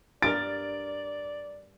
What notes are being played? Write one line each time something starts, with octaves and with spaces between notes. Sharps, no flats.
G2 A#4 D5 A6 D7